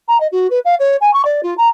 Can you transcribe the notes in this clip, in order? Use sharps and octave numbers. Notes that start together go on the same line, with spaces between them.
A#5
D#5
F#4
B4
F5
C#5
G#5
C#6
D5
F4
A#5